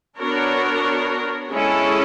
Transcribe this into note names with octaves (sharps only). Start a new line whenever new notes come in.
B3 D4 F#4 A#4 C#5
G#3 C#4 E4 A4